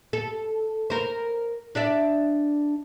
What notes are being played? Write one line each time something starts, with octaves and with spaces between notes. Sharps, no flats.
A4
A#4 C5
D4 D5 E5